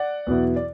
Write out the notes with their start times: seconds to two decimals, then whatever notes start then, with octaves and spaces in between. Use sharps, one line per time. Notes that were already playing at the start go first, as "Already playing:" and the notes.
Already playing: D5 F#5
0.27 E2 B2 F#3 B3 E4
0.56 D5